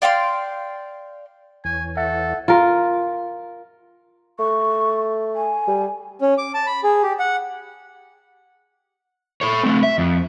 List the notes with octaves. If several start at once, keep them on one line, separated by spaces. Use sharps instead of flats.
D5 F5 G5 C6
E2 E3 C#5 G#5
A4 E5 F#5
F4 A#4
A3 C#6
G#5
G3
C#4
D6
A5
B5
G#4
G4
F#5
A4 C#5
A3 C4
E5
F2